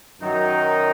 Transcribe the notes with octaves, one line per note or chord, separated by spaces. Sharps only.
F#2 D#3 F#3 D#4